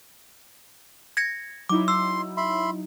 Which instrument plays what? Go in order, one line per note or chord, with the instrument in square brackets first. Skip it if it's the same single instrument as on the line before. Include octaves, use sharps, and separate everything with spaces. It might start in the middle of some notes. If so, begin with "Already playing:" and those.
[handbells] G#6 A#6 C#7
[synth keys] F#3 D#4 E4 [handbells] D6
[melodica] C6 [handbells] E6
[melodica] E5 B5 C6